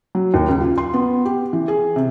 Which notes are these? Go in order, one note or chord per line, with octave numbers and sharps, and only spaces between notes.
F#3
D#2
C#2
F4
C6
B3
G4
E3
G#4
C3